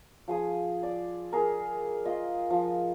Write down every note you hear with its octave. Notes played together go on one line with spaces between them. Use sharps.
F3 G#4 D#6
D5
G#4 A#4
F4 D#5
F3